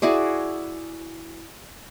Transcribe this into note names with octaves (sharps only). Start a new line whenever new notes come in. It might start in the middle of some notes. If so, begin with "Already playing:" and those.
E4 F#4 G#4 D5